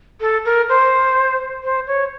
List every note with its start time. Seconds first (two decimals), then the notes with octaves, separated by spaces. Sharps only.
0.21 A4
0.45 A#4
0.69 C5
1.63 C5
1.87 C#5